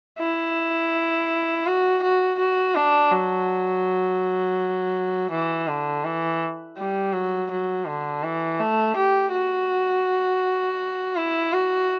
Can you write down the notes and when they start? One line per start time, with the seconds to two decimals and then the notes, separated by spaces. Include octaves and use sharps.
0.20 E4
1.66 F#4
2.03 F#4
2.39 F#4
2.75 D4
3.12 F#3
5.31 E3
5.68 D3
6.05 E3
6.78 G3
7.13 F#3
7.51 F#3
7.88 D3
8.24 E3
8.60 A3
8.96 G4
9.33 F#4
11.16 E4
11.53 F#4